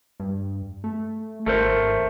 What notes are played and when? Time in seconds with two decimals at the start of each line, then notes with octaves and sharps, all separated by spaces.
0.20 G2
0.84 A3
1.46 G#1 A3 A#4 C5